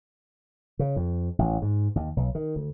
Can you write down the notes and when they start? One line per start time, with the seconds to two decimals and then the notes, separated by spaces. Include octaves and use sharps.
0.79 C#3
0.96 F2
1.39 A1
1.62 G#2
1.95 D#2
2.17 B1
2.35 D#3
2.56 D2